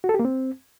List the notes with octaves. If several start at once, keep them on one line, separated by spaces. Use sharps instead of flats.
F#4
A4
G4
A#3
C4